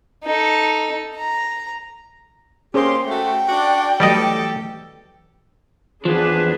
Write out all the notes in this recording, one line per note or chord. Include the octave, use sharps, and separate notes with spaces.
D#4 A4
A#5
A#3 C#4 G4 G#4 C5 C6
A3 F#4 G5
D4 F#4 D5
E3 F#3 G3 A3 G4 A4 D5 D#5
E2 F3 D4 G#4 B4